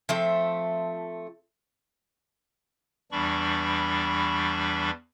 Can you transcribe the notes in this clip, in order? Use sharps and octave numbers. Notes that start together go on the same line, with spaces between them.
F3 A3 C4 E5
E2 E3 G3 D4 B5 C#6